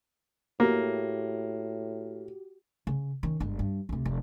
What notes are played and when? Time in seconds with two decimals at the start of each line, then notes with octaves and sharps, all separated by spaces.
0.60 A2 A#3 F#4 G4
2.87 C#3
3.23 D#3 C#4
3.40 G1 G#3
3.59 G2
3.89 D2 C3
4.05 F1